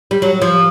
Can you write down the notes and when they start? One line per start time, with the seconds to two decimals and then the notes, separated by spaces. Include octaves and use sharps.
0.11 G3
0.22 F#3
0.42 F3